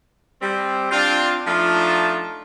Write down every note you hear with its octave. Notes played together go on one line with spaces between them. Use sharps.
G3 C4
C4 D4 F4
F3 A3 D4 D#4 F4